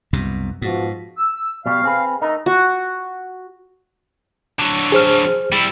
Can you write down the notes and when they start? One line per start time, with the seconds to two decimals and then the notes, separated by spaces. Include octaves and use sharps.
0.13 C2 F#2 B2
0.62 G#2 B2 F3 F#4
1.18 E6
1.35 E6
1.66 B2 G3 F5
1.83 C4 G#4 B4
2.22 A3 D#4 A#4 D#5
2.46 F#4
4.59 D3 F#3
4.92 G#4 C5 F6
5.52 G3 E4